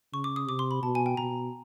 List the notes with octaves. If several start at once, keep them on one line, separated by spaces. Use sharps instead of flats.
C#3 C#6
D6
D#6
C3 D6
C6
B5
B2 A5
G#5
G5
B2 A#5